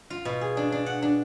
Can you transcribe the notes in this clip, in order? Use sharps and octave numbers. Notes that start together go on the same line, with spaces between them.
F4
B2
G#4
D4
D4
F#5
D4